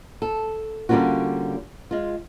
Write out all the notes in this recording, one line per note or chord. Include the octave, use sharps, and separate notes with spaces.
A4
D3 G3 A#3 C#4 F4 F#4
G#3 F4